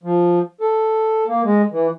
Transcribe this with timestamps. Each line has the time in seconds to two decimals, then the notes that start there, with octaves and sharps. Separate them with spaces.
0.03 F3
0.61 A4
1.27 A#3
1.44 G#3
1.72 E3